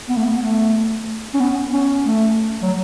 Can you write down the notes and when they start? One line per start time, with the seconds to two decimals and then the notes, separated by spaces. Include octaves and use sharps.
0.09 B3
0.17 A3
0.25 B3
0.41 A3
1.34 C#4
1.40 B3
1.73 C#4
2.06 A3
2.62 F#3